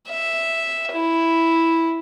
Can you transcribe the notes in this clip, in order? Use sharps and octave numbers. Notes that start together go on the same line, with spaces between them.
E5
E4